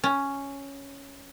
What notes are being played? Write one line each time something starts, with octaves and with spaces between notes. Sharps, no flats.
C#4